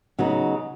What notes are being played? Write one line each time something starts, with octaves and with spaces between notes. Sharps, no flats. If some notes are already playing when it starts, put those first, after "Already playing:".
C#3 F#3 B3 D#4